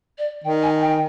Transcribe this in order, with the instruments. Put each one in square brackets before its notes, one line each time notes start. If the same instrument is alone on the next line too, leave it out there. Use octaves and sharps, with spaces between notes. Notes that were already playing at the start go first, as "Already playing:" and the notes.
[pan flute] D5
[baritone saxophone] D#3 [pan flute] G5
[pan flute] G#5
G5